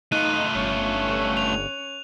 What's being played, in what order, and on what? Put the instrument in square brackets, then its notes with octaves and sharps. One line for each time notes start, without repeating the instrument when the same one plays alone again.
[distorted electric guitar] A3 F4 [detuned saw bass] D#4 [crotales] F#6 D#7
[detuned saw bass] G1 [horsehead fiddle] C#4 C#5
[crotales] F7